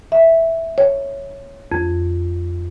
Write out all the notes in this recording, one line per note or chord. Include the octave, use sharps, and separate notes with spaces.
E5
C#5
F2